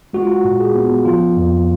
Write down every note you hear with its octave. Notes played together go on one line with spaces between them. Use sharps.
G#3 F#4
F4
F#4
A#2
G#4
B3
F3 F4
F2